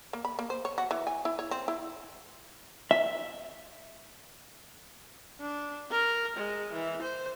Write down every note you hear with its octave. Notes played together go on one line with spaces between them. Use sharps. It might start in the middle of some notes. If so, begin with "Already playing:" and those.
A#3
B5
A#3
C5
C#5
F#4
E3
G#5
E4
C#5
C4
E4
E5
D4
A#4
G#3
E3
C5